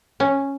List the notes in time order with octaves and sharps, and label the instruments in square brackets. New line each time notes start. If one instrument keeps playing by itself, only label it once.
[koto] C#4